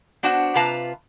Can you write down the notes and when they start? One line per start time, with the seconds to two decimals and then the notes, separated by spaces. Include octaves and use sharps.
0.23 B3 D4 F#4 C5 F#5
0.55 C3 F4 B4 F5 A5 A#5